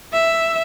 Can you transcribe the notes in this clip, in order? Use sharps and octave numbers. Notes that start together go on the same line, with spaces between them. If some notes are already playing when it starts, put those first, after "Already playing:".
E5